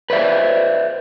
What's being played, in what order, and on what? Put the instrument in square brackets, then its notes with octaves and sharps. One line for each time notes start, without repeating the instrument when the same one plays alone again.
[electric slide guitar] B4 C5 D5 E5